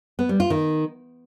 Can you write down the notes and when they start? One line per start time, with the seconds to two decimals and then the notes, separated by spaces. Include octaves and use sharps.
0.19 B3
0.29 G3
0.40 F4
0.50 D#3